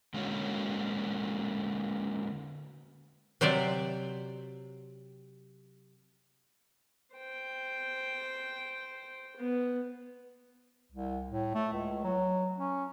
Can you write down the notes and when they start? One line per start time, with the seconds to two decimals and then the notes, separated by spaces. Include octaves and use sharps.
0.14 D3 G#3 A#3 C#4 F#4 C#5
3.41 C3 F#3 C5 D5 E5 G5
7.15 C5 G5
9.36 B3
10.92 C2
11.31 A2
11.55 A3
11.73 C#2
12.04 F#3
12.58 C#4